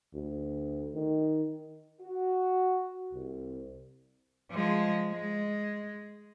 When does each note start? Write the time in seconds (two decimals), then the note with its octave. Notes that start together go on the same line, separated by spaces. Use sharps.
0.14 D2
0.94 D#3
2.01 F#4
3.12 C2
4.51 F3 G#3
5.12 G#3